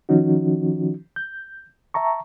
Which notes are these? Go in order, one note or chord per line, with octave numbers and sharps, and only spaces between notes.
D#3 F3 C#4 D#4 F#4
G6
E5 A5 A#5 C#6